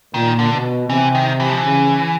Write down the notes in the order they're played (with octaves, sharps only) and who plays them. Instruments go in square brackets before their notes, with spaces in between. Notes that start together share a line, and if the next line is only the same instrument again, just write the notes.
[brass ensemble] A#2 [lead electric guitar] D#3
[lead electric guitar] D3
[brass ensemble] B2
[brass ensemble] C3 [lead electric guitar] E3
[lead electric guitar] D#3
E3
F3
E3
[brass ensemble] C#3